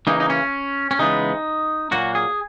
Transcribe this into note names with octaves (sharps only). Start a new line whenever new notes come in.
C#3 E3 A#3 D#4
D#4
C#4
C#4
C#3 E3 G#3 B3 D#4
A#2 F#3 A#3 F#4
G#4